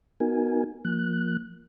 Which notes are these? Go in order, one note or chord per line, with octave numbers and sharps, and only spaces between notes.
B3 D#4 F#4 A#4 G#5
F3 A#3 F#6